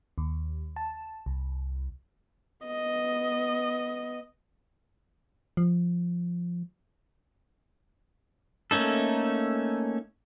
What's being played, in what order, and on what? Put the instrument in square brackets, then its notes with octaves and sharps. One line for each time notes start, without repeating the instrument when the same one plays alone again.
[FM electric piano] D#2
A5
C2
[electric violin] B3 D#5
[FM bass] F3
[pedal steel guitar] A3 A#3 C#4 D#4 A4